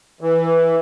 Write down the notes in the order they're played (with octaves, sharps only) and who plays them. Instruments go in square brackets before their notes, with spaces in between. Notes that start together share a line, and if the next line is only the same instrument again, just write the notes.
[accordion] E3